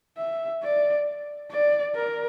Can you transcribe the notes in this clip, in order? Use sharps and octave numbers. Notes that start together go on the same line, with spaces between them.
E5
D5
D5
A#4